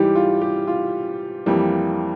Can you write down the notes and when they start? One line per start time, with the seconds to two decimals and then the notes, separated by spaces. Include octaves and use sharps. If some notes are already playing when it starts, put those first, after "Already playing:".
Already playing: G#2 E3 G3 G4
0.15 F4
0.41 G4
0.67 F4
1.46 F2 E3 G3 A#3